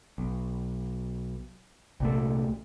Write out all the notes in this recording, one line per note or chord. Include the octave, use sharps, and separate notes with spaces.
B1
C2 A#2 A3